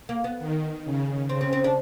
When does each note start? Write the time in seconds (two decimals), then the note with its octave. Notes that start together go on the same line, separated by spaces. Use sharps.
0.09 A#3
0.24 B3
0.39 D#3
0.85 C#3
1.29 C#3 C4
1.41 C4
1.53 C4
1.64 D4